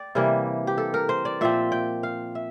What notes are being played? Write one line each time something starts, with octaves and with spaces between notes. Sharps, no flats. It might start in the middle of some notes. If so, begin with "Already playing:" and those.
Already playing: D5 G5
C3 E3 G3 A#3 A#4
G4
A4
A#4
C5
D5
A#2 F3 C4 E5
G5
F5
E5